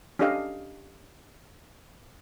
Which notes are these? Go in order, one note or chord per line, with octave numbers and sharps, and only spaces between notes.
C#4 D4 G4 A4 D#5 F5